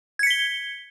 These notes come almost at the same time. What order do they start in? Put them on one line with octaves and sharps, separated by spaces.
G#6 C#7 B6 G7